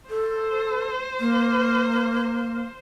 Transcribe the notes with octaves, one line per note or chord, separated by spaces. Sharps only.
A4 C5
A#3